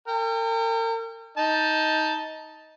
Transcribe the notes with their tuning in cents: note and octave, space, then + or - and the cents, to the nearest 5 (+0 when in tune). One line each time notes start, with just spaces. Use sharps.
A#4 -40 G5 +30
D#4 +15 A5 +0